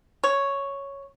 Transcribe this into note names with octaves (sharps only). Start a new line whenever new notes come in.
C#5